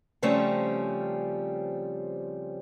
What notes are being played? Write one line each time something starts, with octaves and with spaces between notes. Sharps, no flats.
C#3 F3 G3 A3 C4 C#4